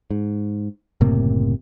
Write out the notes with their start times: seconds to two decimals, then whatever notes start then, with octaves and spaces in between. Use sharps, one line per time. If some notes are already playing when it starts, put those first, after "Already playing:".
0.11 G#2
1.01 F#1 A2 C3 A#3